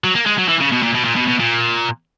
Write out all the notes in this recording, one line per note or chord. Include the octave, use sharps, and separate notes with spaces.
F#3
A#3
G#3
F#3
E3
C#3
B2
A#2
B2
A#2
B2
B2
A#2